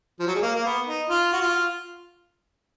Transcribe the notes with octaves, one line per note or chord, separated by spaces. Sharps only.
F3
F#3
G#3
A#3
A#3
B3
D#4
F4
F#4
F4